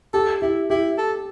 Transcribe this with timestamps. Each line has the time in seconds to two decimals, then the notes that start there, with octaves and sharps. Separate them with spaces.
0.14 G4 A4
0.42 E4 G4
0.70 E4 G4
0.98 A4